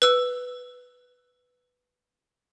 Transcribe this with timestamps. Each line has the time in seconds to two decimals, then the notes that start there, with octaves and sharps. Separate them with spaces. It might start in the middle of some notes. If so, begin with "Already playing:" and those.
0.02 B4 E6